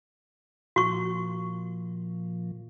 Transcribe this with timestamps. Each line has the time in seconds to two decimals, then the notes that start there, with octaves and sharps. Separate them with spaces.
0.76 A#2 F3 F#4 C#6